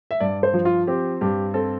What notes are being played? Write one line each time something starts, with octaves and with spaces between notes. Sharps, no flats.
E5
G2 D5
C5
F3
F4
C4 G4
G2 G4
C4 A4